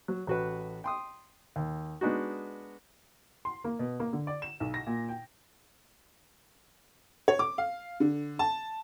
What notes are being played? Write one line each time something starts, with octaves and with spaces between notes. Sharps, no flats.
F#3
A1 F#4 B4
G5 C6 D#6
D#2
G#3 B3 D4 D#4 F#4
C6
A#3
B2
A#3
D3
D5
E7
B1
A#6
A#2
G5
C#5
D6
F5
D3
A5